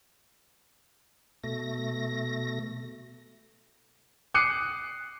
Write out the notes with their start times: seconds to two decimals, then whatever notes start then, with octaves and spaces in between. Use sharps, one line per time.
1.44 B2 A3 A#6
4.34 D6 D#6 F#6 C7 C#7 D#7